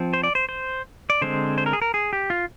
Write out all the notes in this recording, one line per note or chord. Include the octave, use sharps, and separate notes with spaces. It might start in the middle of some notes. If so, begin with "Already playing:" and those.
Already playing: F3 C4
C5
D5
C5
C5
D5
D3 G#3 C4 C5
C5
A#4
G#4
A#4
G#4
G4
F4